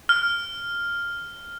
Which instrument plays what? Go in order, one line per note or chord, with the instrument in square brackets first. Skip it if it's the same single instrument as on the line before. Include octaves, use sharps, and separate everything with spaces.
[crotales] F6